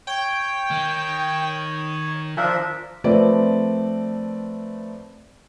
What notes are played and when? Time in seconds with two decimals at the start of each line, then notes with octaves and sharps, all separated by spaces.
0.07 C#5 G5
0.71 D#3
2.37 F3 D4 A#4 E5
3.04 F3 A3 C4 A#4 B4 D5